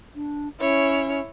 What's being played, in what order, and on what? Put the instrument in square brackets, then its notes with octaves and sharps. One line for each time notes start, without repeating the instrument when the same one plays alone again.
[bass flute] D4
[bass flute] C#4 [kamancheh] E4 C#5